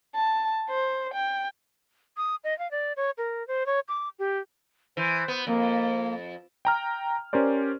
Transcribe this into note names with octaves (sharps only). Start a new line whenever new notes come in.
A5
C5
G5
D#6
D#5
F5
D5
C#5
A#4
C5
C#5
D6
G4
E3 C5
B3
F2 A#3
G5 A#5 F6
C#4 G4 A#4 C5 D5